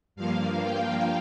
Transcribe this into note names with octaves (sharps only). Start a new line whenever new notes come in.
G2 F3 A#3 F5
G5